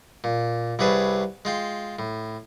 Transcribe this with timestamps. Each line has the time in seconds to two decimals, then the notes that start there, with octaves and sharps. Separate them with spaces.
0.24 A#2
0.79 C2 C3 G#4 B4 C#5 A5
1.45 G#3 F4 G5
1.99 A2